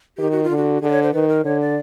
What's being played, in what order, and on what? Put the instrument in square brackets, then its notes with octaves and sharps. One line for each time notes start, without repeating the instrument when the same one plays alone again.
[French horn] D#3 [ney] G4
[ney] F#4
F4
[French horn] D3
[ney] F#4
[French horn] D3 [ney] G#4
[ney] D5
C#5
C5
[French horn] D#3 [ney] B4
[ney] A#4
[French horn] D3 [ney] C#5
[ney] D5